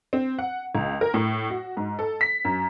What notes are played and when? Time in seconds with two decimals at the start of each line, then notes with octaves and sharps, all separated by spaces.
0.13 C4
0.38 F#5
0.75 C#2
1.01 A#4
1.14 A2
1.50 F#4
1.77 G#2
1.99 A4
2.21 B6
2.45 F#2